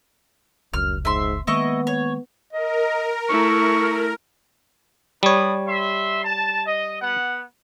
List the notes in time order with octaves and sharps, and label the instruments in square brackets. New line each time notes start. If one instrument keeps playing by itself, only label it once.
[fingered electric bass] F1 C#2 [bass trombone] F#2 [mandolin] F6
[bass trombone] G#2 [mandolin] E5 C6
[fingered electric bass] D#3 G#3 A#3 [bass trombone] B3 [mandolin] E4 D#5 C#6
[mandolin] C#5
[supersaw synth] A#4 [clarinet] D#5
[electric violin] A3 E4 [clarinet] C#6
[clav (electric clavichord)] G3 C#5 [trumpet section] D4 B4 D#6
[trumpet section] E5 C6
A5
D#5
B3 F#5